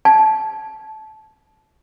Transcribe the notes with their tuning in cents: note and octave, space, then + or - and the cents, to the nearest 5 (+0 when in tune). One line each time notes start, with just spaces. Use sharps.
A5 -20